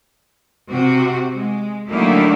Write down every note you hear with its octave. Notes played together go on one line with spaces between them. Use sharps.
C3 F#4
G#3
D3 D#3 F#3 A3 A#3 E4